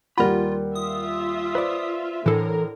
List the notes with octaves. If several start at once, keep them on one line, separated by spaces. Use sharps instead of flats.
D#2 G3 F4 A#4 F#5 B5
F4 E5 D#6
B4 C5 D5
A2 D3 E3 A4 A#4